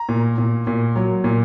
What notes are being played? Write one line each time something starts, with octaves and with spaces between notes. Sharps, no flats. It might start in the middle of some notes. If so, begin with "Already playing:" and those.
Already playing: A#5
A#2
A#2
A#2
F#3
A#2